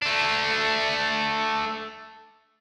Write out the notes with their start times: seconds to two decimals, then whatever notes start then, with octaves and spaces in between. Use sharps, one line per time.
0.02 A3 D4